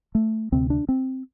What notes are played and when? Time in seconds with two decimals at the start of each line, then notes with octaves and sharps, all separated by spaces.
0.15 A3
0.52 D2 C3 C4
0.70 D4
0.89 C4